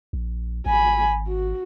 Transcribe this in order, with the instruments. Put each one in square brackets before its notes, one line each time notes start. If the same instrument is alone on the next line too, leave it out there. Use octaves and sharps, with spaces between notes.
[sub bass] A#1
[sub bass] G#1 [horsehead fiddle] G#5 B5
[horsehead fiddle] F#4